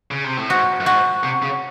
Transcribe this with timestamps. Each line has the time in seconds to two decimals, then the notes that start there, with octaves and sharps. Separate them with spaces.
0.11 C#3
0.24 C3
0.37 A2
0.50 G#2 F#4
0.80 F#2
0.86 G#2 F#4
1.24 C3
1.42 C#3